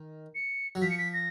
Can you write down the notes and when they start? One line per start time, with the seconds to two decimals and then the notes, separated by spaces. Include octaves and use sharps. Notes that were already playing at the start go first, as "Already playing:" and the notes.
Already playing: D#3
0.35 C#7
0.75 F#3
0.82 F3 B6
0.90 C#7
0.98 B6
1.13 A#6